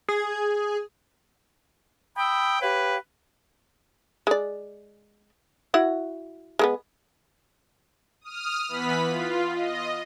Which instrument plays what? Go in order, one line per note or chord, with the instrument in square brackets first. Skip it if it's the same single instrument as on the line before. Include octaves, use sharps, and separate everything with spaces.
[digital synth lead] G#4
[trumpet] G5 [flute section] B5 D#6 E6
[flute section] G4 C#5 F5 [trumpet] B4
[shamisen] G#3 D5
E4 F#4 F#5
G#3 A#3 B3
[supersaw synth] D#6 F6
E3 B3 B4 B5 B6
F4
D#5